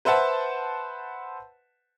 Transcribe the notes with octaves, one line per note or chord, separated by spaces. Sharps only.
B4 C5 E5 F#5 A5